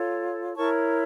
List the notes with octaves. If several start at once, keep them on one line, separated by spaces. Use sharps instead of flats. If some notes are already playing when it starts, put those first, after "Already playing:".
Already playing: F4 A4 C#5
E4 A#4 C#5 A5 C#6